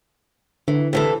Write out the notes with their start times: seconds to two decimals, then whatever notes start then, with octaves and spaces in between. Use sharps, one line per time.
0.68 D3 E3
0.93 C3 E3 A4